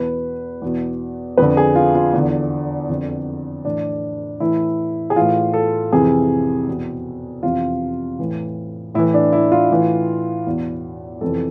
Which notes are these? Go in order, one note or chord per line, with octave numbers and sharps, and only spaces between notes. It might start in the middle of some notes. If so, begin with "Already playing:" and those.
Already playing: E2 B2 B4
E2 B2
F2 D3 B4
G#4
F4
F4
E2 D3
F2 D3
A2 E3 D4
A2 E3 E4
G#4
A2 E3 F4
A4
F2 C3 E3 G#4
E2 B2
F2 C3 E3 F4
A2 E3
A2 E3 E4
D4
E4
F4
A2 E3
E2 B2
F2 C3 E3 A4